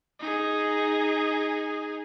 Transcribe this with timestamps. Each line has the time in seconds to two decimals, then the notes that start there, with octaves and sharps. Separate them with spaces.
0.19 D#4 G#4